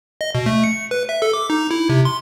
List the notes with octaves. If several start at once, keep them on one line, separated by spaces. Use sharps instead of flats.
D#5
B2
A3
C#7
B4
E5
A4
D6
D#4
E4
C3
C6